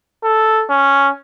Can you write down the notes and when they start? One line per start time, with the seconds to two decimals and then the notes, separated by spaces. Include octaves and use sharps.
0.24 A4
0.70 C#4